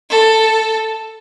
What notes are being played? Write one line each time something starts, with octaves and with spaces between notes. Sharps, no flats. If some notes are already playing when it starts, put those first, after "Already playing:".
A4